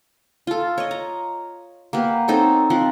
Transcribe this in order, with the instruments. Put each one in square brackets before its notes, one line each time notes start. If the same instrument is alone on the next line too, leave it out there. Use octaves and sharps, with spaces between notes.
[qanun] F4 A4
C#5 D#5
A#5
A#3 B3 G4
C4 D#4 A4 C#5
F3 C4 F#5